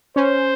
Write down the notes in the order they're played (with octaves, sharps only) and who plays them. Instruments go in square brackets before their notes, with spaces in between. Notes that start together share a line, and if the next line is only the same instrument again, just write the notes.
[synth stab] C#4 [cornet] C5